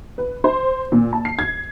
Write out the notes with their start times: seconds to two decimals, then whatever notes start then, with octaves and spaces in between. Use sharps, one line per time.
0.18 B4
0.44 C5
0.92 A#2
1.13 A5
1.25 C7
1.39 G#6